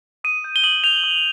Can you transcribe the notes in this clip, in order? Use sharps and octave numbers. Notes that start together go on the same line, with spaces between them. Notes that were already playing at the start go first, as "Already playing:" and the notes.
D#6 D#7
G6
G7
D#6 F#7
G6 F7
D#6